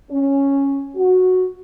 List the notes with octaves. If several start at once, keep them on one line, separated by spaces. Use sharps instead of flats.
C#4
F#4